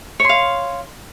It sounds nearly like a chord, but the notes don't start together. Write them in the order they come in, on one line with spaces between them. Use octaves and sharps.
C#5 C6 F5